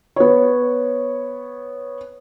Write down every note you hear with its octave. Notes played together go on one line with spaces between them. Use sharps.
B3 C#5